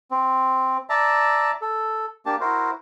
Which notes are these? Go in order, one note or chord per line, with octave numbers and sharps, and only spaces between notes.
C4
D5 E5 A5 A#5
A4
A#3 D4 G4 A5
E4 F#4 A#4 C5